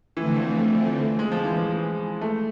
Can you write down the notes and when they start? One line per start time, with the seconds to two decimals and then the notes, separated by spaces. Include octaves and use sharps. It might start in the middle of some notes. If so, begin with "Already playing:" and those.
0.17 D3 E3 F3 A3 C4
1.19 G#3
1.32 F3
1.45 E3
1.57 F3
1.71 G#3
2.21 A3